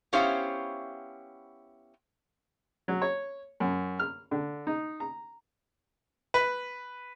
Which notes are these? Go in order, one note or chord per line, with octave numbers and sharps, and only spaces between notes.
B3 C#4 E4 G4 C5 F5
F#3
C#5
F#2
F6
D3
D#4
A#5
B4